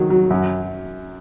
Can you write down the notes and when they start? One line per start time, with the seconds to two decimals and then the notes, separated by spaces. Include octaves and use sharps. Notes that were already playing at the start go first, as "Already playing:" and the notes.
Already playing: D#3 F#3
0.10 F#3
0.30 F#2